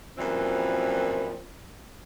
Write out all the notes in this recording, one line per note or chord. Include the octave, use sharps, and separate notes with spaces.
F#2 A#2 E3 F3 G3 C4